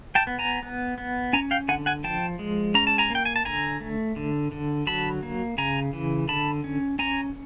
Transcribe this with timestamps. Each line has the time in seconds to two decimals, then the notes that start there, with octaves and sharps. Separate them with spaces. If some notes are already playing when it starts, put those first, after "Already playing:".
0.15 G5 A5
0.27 B3
0.39 G#5 A#5
0.63 B3
0.98 B3
1.33 C#4 G#5 A#5
1.51 F5 G5
1.68 D3 F#5 G#5
1.86 F#5 G#5
2.04 F3 G5 A5
2.39 G#3
2.74 C#4 A#5
2.87 A5
2.98 G#5 A#5
3.10 A#3 G5
3.25 G#5
3.36 A5
3.45 D3 G#5 A#5
3.81 A3
4.16 D3
4.52 D3
4.87 F#3 A5 B5
5.23 A#3
5.58 C#3 G#5 A#5
5.93 E3
6.28 D3 A5 B5
6.64 C#4
6.99 C#4 G#5 A#5